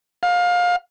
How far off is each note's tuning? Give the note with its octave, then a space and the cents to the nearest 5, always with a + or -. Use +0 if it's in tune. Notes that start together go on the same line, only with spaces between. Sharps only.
F5 +25